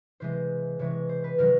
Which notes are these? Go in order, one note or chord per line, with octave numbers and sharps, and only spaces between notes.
C3 E3 G#3 C5
C3 E3 G#3 C#5
C5
B4
C3 D#3 F#3 A#4